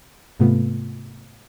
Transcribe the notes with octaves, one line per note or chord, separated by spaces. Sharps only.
G#2 C3 A3 B3 F4